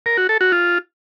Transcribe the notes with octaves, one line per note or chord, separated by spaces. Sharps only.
A#4
F#4
A4
F#4
F4